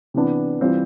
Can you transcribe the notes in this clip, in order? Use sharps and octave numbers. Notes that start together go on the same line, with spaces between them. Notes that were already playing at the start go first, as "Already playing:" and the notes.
C3 E3 B3 D4
E3 G3 C4 F4 C5